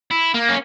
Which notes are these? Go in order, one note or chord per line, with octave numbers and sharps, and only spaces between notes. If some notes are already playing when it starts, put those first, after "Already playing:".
E4
A#3
C#4